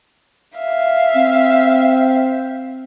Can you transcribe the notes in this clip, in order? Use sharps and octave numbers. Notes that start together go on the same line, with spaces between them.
E5 F5
C4